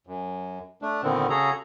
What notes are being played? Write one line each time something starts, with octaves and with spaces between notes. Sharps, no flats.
F#2
A3 D4
A#2 D3 D#3 B3 C4
C#3 F#4 G#4 A4 A#5